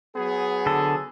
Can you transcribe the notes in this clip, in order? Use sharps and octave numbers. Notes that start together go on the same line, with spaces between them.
F#3 B3 G#4
D3 A4